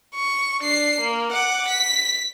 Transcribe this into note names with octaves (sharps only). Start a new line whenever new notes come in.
C#6
D4 C7
A#3
F#5 D6
B6